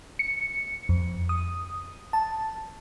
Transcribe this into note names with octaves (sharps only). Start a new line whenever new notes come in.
C#7
F2
D#6
A5